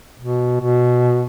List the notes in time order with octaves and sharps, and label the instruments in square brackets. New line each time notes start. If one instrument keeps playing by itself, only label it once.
[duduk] B2
B2